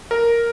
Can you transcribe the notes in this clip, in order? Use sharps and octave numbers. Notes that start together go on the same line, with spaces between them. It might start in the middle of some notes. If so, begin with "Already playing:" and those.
A#4